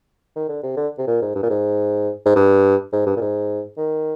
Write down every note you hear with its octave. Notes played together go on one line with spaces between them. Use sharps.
D#3
D3
C3
D3
C3
A#2
G#2
G2
A#2
G#2
G#2
G2
G#2
G2
A#2
G#2
D#3